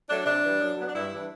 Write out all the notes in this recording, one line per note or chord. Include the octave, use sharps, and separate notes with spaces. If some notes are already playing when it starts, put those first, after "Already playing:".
F#3 A3 D4
C3 D4
E3 G3
F#2
F#3 B3
D4
G2 E4
E3 G3 D4